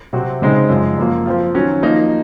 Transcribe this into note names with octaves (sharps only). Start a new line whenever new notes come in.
C3 F#3 C4 F#4
C#3 G#3 C4 D#4
F#2 F3 G#3
F#2 F3 A#3
F3 C4 F4
D#3 F#3 C#4 F#4
F3 A#3 D#4